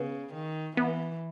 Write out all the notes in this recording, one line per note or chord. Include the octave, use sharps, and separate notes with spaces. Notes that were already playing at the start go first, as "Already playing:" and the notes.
Already playing: C#3 B3
D#3
E3 B3